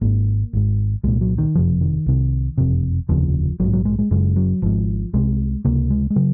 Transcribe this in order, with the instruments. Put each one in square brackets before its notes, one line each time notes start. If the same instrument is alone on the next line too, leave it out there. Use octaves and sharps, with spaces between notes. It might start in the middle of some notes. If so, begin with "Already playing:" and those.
[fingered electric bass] G#1 G#2 A#3
G#1 G#2
C2 A#2 G#3
F#3
D#3
F#1 F2 C3 F3
D#3
C2 C3
F#1 F2 C3
F1 D#2 C#3 F3
A#1 G#2 F#3
F#3
G#3
G#3
F#1 F#2 C#3 G#3
F#3
G#1 G#2 F3
C2 C3 G#3
C#2 C3 A#3
G#3
G#3
C#3 F#3